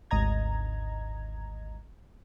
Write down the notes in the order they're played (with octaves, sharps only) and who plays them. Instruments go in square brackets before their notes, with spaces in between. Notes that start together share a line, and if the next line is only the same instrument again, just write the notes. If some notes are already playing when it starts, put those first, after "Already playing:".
[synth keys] G#1 D2 D#5 A#5 G#6